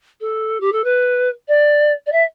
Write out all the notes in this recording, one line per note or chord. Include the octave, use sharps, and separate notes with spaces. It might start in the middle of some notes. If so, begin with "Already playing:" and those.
A4
G4
A4
B4
D5
D5
E5